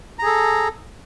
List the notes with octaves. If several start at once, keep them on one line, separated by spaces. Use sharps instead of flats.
G#4 A4 A#5